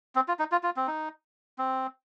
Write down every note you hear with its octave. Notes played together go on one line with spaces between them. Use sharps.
C4
F4
D#4
F4
F4
C4
D#4
C4